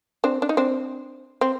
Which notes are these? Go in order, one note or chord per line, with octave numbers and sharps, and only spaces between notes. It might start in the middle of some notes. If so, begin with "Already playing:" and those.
C4 D4
D4
D#4
C4 D4
C4